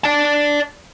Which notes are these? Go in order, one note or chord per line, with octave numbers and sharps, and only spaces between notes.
D5 A5